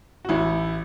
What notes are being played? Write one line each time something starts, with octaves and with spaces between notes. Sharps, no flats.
F#4
A1 E4